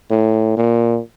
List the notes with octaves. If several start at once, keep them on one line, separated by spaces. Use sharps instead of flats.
A2
A#2